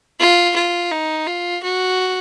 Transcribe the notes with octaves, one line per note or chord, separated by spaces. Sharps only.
F4
F4
D#4
F4
F#4